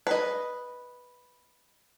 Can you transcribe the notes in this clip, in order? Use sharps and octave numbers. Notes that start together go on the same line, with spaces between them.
B4 D#5